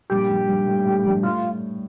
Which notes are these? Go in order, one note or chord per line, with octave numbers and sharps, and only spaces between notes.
G2 A#2 G4
G2
G2
A2
A2
G2
A2 F4